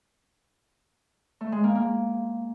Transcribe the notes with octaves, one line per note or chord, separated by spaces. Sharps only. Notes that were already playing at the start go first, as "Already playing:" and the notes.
A3
G#3
A#3
A#3